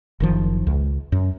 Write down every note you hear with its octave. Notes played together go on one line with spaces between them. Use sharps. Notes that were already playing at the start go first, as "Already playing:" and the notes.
F#1 D#3 F3
C#2
F#2